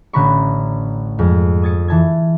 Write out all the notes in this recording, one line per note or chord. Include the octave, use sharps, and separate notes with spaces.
A1 D3 D4 A#5 B5 C#6
F2 G#2 G#3
D#6 G#6 A6 C#7
E3 A5 G#6